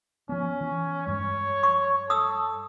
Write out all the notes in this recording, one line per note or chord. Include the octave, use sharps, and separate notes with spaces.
F3 B3 C#4
E3
G2 G#3 C#5
C#6
A4 D#6 E6